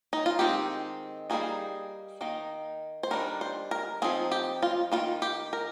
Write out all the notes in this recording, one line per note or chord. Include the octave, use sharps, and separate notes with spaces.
D#4
F4
D#3 G#3 C4 D#4 G4
G3 A#3 D#4 G#4
D#3 A#3 D#4
C5
D#3 G3 D4 A#4
C5
A#4
F3 C4 D#4 G#4
G4
F4
D#3 G3 A#3 F4
G4
A#4